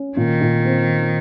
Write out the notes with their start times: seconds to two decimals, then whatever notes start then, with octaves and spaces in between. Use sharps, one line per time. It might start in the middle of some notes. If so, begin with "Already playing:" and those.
Already playing: C#4
0.17 A#2 D#3
0.41 A#2
0.65 C4